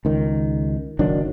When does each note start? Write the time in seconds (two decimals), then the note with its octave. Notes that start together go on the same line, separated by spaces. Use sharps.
0.05 C#2 D#3
0.99 F#1 D#3 F#3 D4